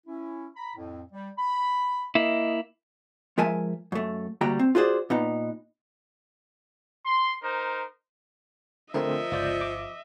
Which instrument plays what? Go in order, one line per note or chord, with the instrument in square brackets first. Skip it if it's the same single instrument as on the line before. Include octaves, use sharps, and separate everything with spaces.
[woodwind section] C#4 E4
A#5 B5
F2 A2
G3
B5
[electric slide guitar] A#3 E4 [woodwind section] D#5
[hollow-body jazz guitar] F3 G#3 A#4 E5 G#5 A5
F#2 A3
D2 G3 A#3 F#4 G5 A#5
C4
F4 F#4 G#4 C5 D5
A#2 B3 D#4
[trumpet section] C6
D#4 A#4 C5
[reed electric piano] D3 A3 C4 [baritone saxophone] F3 [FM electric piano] A#4 [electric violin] D#5 E5
[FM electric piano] G1 F4 [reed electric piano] C#2 D5 G6
[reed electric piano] D6